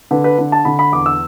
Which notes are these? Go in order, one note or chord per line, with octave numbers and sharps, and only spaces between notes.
D3 B4
B4
D3
A5
D3 B5
B5
E2 D6
E6